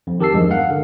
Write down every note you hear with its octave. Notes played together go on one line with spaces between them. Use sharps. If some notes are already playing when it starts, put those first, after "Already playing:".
F2
D#3 G4 A#4 A5 E6 C7
E2 G2 F3 G#3
A#4 F5 F#5
D3